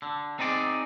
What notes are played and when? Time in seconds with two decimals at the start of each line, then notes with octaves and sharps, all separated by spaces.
0.02 D3
0.39 C4 D#4 G#4 D5